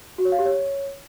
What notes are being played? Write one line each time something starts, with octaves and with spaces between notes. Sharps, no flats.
F#4
C#5
F5
G4
C#5